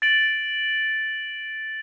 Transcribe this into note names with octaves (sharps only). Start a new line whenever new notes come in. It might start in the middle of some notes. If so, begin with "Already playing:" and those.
A6 D7 F#7